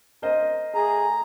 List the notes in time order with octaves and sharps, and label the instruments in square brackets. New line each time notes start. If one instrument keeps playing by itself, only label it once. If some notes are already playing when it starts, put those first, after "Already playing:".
[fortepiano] A#4 C5 D#5
[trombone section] A3 G#4 [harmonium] A#5